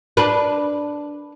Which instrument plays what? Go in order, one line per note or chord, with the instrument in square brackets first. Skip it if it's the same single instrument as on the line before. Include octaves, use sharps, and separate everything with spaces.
[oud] D4 B4